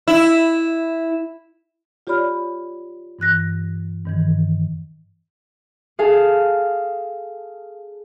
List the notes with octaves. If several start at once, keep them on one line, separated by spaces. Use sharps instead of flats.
E4
F4 G4 C#5 D5 B5 F6
G2 E3 F#6 A#6
G2 D#3 E3
G#4 A4 F5